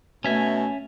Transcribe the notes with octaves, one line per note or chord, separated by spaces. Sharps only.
B2 A3 C#4 E5 G#5